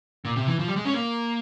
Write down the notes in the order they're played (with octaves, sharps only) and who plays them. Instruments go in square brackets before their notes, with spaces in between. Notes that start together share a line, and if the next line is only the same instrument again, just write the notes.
[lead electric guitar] A#2
C3
E3
F3
G3
G#3
C#4
A#3